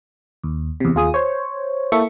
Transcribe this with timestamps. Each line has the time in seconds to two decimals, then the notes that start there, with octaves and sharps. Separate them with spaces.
0.44 D#2
0.80 E2 C3
0.95 D#2 F4 G#4 D#6
1.14 C5 C#5
1.92 A#3 E4 A4 E5 C#6